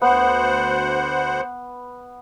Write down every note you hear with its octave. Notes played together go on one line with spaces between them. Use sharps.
D2 B3 C5 F#5